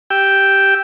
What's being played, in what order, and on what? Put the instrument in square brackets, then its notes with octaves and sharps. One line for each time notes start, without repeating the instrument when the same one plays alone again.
[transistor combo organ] G4 G5 E6